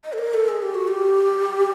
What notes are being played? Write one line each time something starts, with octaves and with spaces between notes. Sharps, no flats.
D#5
A4
A#4
A4
G#4
G4
F#4
G4